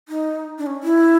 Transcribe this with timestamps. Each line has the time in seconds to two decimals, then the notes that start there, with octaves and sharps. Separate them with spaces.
0.09 D#4
0.58 D4
0.67 C#4
0.83 E4